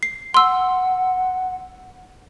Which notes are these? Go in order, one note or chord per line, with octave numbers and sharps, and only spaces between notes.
C7
F#5 C6 E6